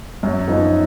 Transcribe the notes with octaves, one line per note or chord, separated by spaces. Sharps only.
F#2
F3 B3 D#4